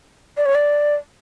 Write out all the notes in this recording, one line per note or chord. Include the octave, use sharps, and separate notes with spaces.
D5
C#5
D5